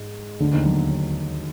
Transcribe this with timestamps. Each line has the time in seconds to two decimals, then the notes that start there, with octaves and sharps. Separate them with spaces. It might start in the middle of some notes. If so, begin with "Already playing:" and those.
Already playing: G#2
0.40 D2 D3
0.53 D#2 D#3
0.66 F#3